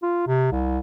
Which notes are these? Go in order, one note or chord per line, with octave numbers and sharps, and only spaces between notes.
F4
C3
C2